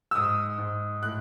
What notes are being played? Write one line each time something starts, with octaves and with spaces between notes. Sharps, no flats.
E6
G#2 D#6
G#2
A2 F#6